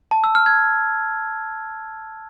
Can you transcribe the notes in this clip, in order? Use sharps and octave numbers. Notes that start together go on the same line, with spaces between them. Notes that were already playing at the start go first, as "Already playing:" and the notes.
A5
E6
F6
G#6